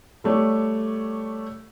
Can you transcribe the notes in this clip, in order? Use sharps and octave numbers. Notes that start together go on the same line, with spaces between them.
G3 A3 C#5 D5